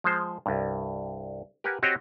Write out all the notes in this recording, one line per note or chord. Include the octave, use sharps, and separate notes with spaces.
F3 G#3 C5
C2 G2
G4 A#4 B4 F#5 G#5
C4 F#4 G4 C#5 D#5